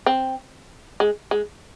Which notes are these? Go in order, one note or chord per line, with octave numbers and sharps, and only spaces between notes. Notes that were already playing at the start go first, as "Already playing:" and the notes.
C4
G#3
G#3